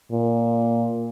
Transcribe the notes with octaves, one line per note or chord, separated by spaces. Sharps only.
A#2